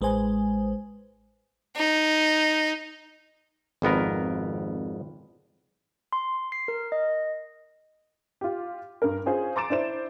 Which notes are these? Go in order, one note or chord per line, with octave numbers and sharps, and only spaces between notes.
A1 G#3 B4 C5 G#5
D#4
G#1 F2 B3 A#4
C6
C7
A#4
D#5
F4 G4
G2 A#4
C#4 F4 G#4 C5
A#5 C6 D6 A6 D7 E7
D4 E4 C5 E7